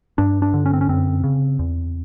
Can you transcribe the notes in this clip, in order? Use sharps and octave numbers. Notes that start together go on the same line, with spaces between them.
G2 D4
D4
D3
C#4
C4
C#4
F#2 C4
C#3
E2